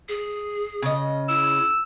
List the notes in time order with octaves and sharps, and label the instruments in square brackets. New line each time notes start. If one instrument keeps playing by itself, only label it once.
[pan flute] G#4
[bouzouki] C#3 D#5
[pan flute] E4 [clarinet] E6